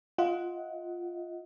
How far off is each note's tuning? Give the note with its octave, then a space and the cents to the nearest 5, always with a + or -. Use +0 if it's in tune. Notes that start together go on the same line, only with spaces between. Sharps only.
F4 +0 D#5 +30 F#5 +0